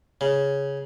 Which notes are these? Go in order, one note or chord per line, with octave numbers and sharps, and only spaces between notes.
C#3